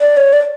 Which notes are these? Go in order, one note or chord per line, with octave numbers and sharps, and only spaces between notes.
D5
C#5
D5